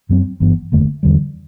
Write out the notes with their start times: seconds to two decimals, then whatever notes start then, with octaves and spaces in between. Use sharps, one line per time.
0.09 F#2 F#3 C4
0.40 G1 G2 E3 B3
0.72 F#1 E2 D3 A3
1.03 E2 D3 G3